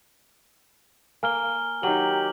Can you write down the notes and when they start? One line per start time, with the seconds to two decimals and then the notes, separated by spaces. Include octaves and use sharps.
1.23 A#3 G#5 F6 G7
1.83 D#3 F#3 G4 F#7